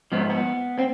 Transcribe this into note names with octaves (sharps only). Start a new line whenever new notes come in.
G#2 F3 B3
B3
C4